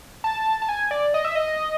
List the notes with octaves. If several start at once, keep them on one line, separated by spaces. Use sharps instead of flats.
A5
A5
G#5
D5
D#5
E5
D#5